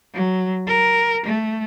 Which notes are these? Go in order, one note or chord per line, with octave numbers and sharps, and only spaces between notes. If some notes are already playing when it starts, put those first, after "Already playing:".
F#3
A#4
A3